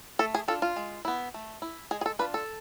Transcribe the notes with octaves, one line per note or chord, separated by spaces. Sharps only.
A3 A4
G#4
D4 F4 A4
F4
G#3
B3 E4
A3
E4
G#3 G#4
G#4
A4
D4 F4 B4
A4